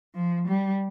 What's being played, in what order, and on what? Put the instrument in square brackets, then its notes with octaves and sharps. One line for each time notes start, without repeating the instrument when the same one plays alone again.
[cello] F3
G3